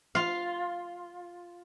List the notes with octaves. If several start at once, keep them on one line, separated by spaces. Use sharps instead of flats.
F4 F5